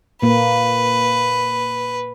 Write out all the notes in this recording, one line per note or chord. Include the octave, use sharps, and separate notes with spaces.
A#2 A#3 B4